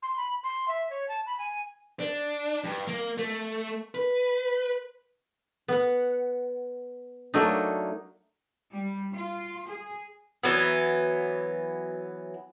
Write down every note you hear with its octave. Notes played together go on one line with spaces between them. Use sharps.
C6
B5
C6
E5
C#5
A5
B5
G#5
D4
G2
A#3
A3
B4
B3 F#5
F#3 A3 A#3 D4 D#4
G3
F4
G#4
E3 F#3 B3